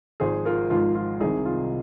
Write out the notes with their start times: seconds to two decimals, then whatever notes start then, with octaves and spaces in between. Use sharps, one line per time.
0.20 G#1 G#2 F3 G#4 C5
0.45 F4 A#4
0.70 G#1 G#2 F3 F4
0.95 F4
1.20 C2 C3 D#3 D#4 G#4
1.46 F4